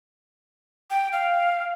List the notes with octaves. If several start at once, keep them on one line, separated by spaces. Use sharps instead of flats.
G5
F5